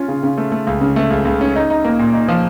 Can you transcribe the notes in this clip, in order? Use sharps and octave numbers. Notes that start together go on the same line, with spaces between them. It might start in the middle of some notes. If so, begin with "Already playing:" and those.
Already playing: C#4 F4
C#3
C#3
A3
A3
C#2
C#3
A3
C#2
C#2
C#4
D#4
D#4
A#3
A#2
D#4
F3